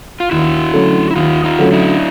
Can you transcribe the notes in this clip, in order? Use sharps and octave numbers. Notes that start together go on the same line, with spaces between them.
F4
D#2 E4 F#4
D3 F#3 A3 C#4
E4
D#2 D#4 F4
D#4 F4
D3 F#3 A3 C#4
D4 E4